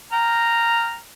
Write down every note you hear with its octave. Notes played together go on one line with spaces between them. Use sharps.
G5 A#5 F6